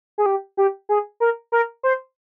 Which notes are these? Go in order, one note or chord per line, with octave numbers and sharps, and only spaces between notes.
G#4
G4
G4
G#4
A#4
A#4
C5